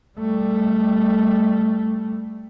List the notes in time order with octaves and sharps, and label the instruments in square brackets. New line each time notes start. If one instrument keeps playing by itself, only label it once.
[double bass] G3 A3